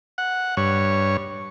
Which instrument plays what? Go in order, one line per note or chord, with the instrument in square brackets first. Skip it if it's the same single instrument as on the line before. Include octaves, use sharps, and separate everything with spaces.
[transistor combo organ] F#5
G2 C#5